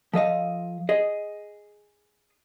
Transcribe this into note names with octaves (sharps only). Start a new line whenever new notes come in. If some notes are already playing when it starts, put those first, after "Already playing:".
F3 A4 D#5 F5
G#4 D#5